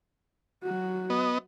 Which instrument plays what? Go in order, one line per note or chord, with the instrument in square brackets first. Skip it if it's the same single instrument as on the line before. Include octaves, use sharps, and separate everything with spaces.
[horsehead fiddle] F#3 F#4
[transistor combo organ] B3 D#5